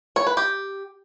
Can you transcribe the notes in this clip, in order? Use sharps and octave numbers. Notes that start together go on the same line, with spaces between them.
C#5
B4
G4